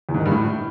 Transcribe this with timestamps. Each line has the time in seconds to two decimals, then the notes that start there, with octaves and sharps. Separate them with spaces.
0.09 E2
0.14 G#2
0.20 D#3
0.26 G2
0.31 A2